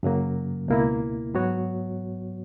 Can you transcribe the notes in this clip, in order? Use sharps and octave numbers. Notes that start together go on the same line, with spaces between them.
F#2 C#3 F#3 A#3
C#2 B2 A#3 E4
G#2 F#3 B3 F#4 C#5